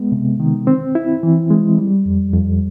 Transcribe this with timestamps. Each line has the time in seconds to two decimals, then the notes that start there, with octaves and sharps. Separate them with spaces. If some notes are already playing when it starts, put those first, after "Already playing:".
Already playing: G#3 B3
0.12 C3
0.40 D#3
0.67 C4
0.95 E4
1.23 E3
1.51 G#3
1.78 G3
2.06 F2
2.33 F2